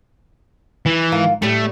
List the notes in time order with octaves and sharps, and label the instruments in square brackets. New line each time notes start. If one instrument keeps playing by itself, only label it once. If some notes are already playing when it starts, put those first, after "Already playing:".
[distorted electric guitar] E3
[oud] G#2 F4 A#4
[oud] A2 G3 [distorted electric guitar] A3